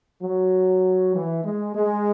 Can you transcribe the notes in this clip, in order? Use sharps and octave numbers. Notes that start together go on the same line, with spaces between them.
F#3
E3
G#3
G#3